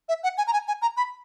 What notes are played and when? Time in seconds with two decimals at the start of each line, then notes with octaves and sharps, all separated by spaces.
0.09 E5
0.23 F#5
0.38 G#5
0.47 A#5
0.53 G#5
0.68 G#5
0.82 A#5
0.97 B5